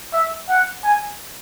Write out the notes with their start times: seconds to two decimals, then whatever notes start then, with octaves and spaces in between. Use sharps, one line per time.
0.14 E5
0.49 F#5
0.84 G#5